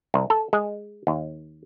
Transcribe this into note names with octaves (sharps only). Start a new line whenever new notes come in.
C2
A4
G#3
D#2